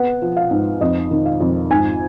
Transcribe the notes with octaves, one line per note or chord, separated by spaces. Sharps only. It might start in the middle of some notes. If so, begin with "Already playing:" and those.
Already playing: B3 F#5
F3
F5
G#2
F2 D#5
D#3
F5
F2
G#2 G#5